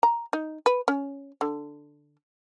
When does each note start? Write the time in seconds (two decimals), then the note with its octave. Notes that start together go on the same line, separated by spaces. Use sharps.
0.03 A#5
0.33 D#4
0.66 B4
0.88 C#4
1.41 D3